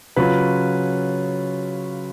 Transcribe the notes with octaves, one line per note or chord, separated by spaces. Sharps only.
C#3 F#3 C#4 F4 B4